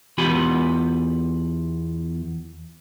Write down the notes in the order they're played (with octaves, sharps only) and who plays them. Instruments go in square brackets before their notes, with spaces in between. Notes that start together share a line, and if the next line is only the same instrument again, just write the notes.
[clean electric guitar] E2 F4 G4 G#5 B5